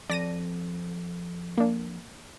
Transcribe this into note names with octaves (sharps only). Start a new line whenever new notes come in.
F2 D5 A#6 D#7
A#3 D4